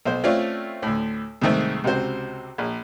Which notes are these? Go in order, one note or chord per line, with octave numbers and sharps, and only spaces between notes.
B1 C5
A3 C4 C#4 F4 D5 F5
D2 A2
C2 G#2 D#3 A3 C4
C#2 C3 F#4 C5
A#1